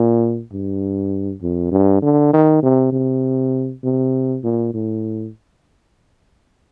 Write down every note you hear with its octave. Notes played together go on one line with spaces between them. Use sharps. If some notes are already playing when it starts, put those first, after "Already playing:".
Already playing: A#2
G2
F2
G2
D3
D#3
C3
C3
C3
A#2
A2